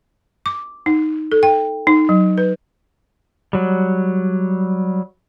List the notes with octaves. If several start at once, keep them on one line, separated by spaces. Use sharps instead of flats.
D6
D#4
A4
G5
D#4
F#3
B4
F#3 G3